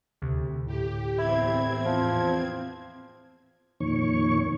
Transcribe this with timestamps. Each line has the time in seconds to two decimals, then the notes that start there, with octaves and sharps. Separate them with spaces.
0.22 D2 C3
0.66 A2 G4
1.18 E2 C4 E4 G#6
1.85 F3
3.80 F2 A#2 D#3 C#5 C#6